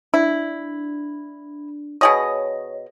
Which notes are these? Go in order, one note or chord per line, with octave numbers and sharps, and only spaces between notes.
D4 E4
B2 G#4 C#5 D#5